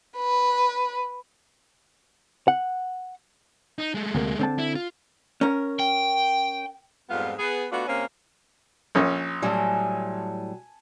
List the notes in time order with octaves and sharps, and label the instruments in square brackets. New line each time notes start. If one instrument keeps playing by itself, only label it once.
[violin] B4
[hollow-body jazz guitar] F#5
[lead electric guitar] D#4
G#3 A3
[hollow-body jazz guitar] D2 C3 A#3
D3 C4 A5
[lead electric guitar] E4
F4
[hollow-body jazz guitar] C#4 A#4
[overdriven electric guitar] G5
[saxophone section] F2 G#2 G3 B3 F4 F5
B3 G#4 B4
A3 B3 D4 F4 F#4
C3 A#3 C4 C#4
[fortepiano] A#1 C#4
[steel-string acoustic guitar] A2 F#3 G3 [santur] G#5 A5